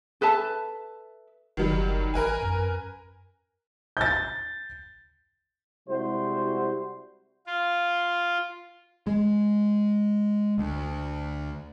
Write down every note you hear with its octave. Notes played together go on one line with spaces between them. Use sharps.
A4 B4 E5 A5
F#1 D#3 F#3 G3
A1 A#4 B4 G#5
F#2
G6 A6
C3 G3 G#3 E4 F#4 C5
F4
G#3
D2